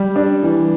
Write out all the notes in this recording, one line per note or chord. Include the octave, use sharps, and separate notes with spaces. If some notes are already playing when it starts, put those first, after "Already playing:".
Already playing: G3
D4
E3